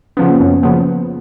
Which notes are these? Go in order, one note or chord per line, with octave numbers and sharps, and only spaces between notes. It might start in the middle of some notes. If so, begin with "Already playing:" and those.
C#3 F3 B3 C#4
A#3
F#2 B3
B3
C#3 F3 A#3 B3